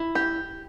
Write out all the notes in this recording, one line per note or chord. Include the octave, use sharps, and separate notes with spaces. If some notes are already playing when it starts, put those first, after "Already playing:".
Already playing: E4
G4